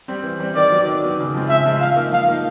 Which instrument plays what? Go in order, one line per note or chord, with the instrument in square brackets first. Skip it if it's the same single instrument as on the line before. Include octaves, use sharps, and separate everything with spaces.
[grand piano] G3 C4
E3
G3 C4
[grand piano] D#3 [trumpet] D5
[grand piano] F#3 B3
D#3
F#3 B3
C#3
F3 G#3 C4
[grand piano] C#3 [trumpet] E5
[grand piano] F3 G#3 C4
[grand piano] F3 [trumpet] F5
[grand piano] A#3 D#4
[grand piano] F3 [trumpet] F5
[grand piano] A#3 D#4